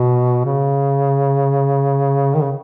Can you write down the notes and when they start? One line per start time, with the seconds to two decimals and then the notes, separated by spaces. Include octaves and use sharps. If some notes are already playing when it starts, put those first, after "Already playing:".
Already playing: B2
0.46 C#3
2.35 D#3
2.42 C#3